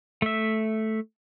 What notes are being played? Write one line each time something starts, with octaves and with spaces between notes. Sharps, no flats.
A3 E5